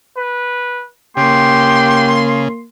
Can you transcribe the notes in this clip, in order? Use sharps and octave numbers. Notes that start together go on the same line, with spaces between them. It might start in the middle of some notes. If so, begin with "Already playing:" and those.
B4
C#3 A#3 G4 C6